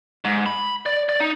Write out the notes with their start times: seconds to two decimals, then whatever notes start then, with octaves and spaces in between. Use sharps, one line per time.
0.25 G#2
0.46 B5
0.86 D5
1.09 D5
1.20 D#4